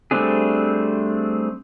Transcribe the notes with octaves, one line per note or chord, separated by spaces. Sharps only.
G3 A3 C4 D4 G#4